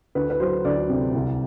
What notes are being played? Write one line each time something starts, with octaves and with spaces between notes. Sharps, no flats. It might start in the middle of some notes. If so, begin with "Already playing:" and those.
D2 B4
B4
F#3 C5
D2 D5
C3
C2